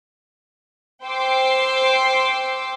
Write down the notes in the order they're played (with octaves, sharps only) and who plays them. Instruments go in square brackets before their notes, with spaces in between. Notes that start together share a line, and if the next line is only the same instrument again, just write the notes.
[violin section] C5 G5 C6 D6 E6 C7